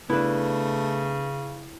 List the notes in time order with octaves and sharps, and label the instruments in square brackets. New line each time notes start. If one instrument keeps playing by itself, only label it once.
[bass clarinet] C#3 [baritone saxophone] A3 [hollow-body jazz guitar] B3 D4 [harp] E4 B4